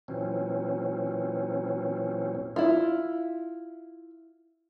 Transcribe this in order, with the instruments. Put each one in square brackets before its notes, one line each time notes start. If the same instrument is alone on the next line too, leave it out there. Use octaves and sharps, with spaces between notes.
[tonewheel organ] A#2 E3 F#3 C4 C#4
[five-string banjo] E4 F4